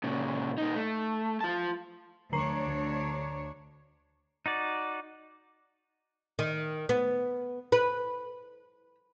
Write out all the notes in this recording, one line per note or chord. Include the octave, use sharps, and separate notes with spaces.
A#2 C#3
A#2 D#4
A3
F4 A5
D2 D3 D4 C#5 A#5 C7
D#4 F#4 D5
D#3
B3
B4